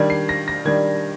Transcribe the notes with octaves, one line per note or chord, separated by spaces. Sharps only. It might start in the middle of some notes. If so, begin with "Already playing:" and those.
Already playing: D#3 G3 D4 G#6
C7
A#6
A#6
D#3 G3 D4 G#6